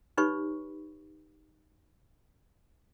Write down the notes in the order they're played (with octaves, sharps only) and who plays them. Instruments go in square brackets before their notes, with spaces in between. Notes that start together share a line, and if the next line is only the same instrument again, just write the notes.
[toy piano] D#4 G4 B4 C#5 B5 C#6